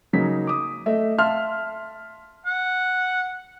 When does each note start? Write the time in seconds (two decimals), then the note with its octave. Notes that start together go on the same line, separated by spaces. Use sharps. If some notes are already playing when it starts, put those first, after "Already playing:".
0.13 C#3 F#3 A#3 D#4 B6
0.47 D6 D#6
0.86 A3 D#5 E5
1.18 E5 F5 A5 C6 F6
2.45 F#5